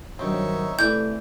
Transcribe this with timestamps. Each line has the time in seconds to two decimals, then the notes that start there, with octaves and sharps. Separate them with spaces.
0.19 G2 D#3 F#3 C4 D#4 C#5 E5
0.79 C3 E3 A3 E4 D5 G6